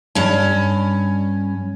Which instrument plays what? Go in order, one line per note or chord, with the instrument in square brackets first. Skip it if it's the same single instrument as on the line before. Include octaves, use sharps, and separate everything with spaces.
[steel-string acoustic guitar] G2 C#4